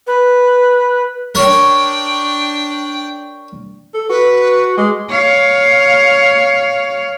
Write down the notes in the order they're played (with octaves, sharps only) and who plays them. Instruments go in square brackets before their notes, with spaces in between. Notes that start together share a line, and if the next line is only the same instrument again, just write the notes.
[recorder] B4
[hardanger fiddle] D4 G5 [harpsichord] A#4 C#5
[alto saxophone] A4
[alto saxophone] F#4 [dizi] B4
[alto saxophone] G#3 [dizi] D6
[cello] C#5 F5